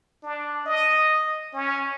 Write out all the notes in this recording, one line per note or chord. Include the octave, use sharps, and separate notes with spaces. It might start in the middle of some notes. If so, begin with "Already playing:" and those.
D4
D#5
C#4